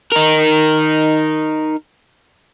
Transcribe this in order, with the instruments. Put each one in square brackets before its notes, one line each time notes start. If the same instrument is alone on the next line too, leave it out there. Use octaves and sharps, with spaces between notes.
[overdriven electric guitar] D#4 A#4